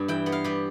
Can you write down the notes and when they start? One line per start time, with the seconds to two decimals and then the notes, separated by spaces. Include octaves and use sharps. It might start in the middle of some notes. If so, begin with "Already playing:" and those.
Already playing: G2 G3 B3
0.08 E3 G5
0.26 B3
0.32 F5
0.44 G3 G4